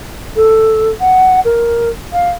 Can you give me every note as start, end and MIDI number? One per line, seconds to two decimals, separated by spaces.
0.36 0.89 69
1.00 1.40 78
1.45 1.89 70
2.13 2.30 77